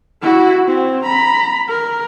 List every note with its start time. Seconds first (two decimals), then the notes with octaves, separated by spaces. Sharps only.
0.22 E4 F#4
0.68 C4
1.03 A#5 B5
1.69 A#4